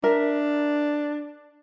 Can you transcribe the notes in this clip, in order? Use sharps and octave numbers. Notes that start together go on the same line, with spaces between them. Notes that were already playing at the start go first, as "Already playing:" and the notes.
D4 A#4 E5